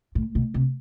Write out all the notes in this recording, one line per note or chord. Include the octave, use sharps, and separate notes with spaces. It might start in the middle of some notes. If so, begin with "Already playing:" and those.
A2
B2
C3